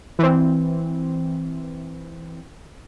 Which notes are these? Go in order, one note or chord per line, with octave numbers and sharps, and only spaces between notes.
E3 C4